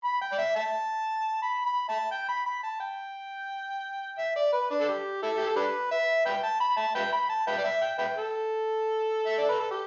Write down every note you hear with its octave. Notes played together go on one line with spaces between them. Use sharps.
B5
G5
D5
E5
E5 A5
B5
B5
E5 A5
G5
B5
B5
A5
G5
E5
D5
B4
D4
A4
G4
E4 A4
G4
A4
D4 G4 B4
E5
B4 E5 G5
A5
B5
E5 A5
B4 E5 G5
B5
A5
B4 E5 G5
D5
E5
G5
B4 E5 G5
A4
E5
D5
B4
A4
G4